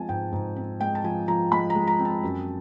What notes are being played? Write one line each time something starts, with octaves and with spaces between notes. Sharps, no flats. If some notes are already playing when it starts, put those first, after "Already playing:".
Already playing: F3 G#3 C4 G#5 A5
G#2 G5
G#2
C4
G#3 G5
A5
F3 G#5
F3 A#5
G#3 B5
A#5
G#3
A#5
C4
A5
F#2